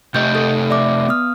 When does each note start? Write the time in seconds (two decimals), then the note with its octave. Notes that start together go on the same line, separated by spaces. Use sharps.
0.14 C3 A3 G4 D#5 G6
0.35 A4
0.70 D5 E5 D6
1.09 B3 D#6 F6